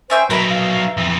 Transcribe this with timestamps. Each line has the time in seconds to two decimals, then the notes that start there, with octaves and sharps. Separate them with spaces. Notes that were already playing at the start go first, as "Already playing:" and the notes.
0.10 C#4 C5 E5 G5
0.30 F#3 D#4 A#4 B4 E5 B5
0.49 F5
0.97 F2 E3